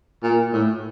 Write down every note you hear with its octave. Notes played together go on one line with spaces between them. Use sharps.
A#2
A2